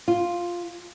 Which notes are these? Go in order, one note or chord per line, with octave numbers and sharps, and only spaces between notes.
F4